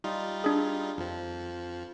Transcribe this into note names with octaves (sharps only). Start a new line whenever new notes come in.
G3 D#4 F4
D4 G#4
F2 F3